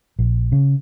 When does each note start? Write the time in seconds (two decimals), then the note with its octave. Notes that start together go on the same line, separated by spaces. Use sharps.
0.19 A#1
0.52 C#3